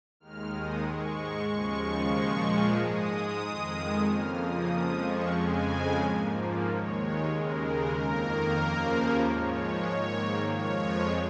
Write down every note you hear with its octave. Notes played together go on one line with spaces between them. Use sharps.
D#2 D#3 G#3 F6
D#6
G#2 G#3 C#6
D#2 C#3 F3 G#3 C#6
A#2 F3 G#3
G#2 G#3 D#6
F2 D#3 G#3
F2 C#3 F3 A#3 F6
D#6
F2 F3 G#3 D#6
C#6
F2 C#3 G#3 G#5
G#2 F3 A#3
D#2 D#3 G#3 C#5
C#5
D#2 C#3 G#3 A#4
A#4
F2 D#3 A#3 A#4
D#2 C#3 F3 A#3
G#2 F3 G#3 C#5
G#2 D#3 A#3
F2 F3 G#3 C#5